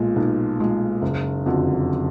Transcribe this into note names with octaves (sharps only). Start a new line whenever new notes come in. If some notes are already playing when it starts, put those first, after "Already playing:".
Already playing: B1 A#2 G#3
B1
A#2 G#3
F#1
F2 D3 F#3